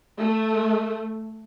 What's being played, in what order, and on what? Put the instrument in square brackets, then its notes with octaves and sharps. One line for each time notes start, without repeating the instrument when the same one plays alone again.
[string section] A3